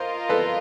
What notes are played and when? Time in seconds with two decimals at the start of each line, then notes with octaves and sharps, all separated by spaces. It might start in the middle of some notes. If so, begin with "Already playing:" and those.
Already playing: F4 A#4 C5 D#5
0.29 A4 B4